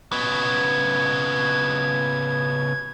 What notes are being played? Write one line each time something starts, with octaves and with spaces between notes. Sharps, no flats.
C#3 B3 G#6